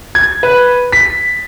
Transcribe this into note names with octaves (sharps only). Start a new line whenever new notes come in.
G#6
B4
B6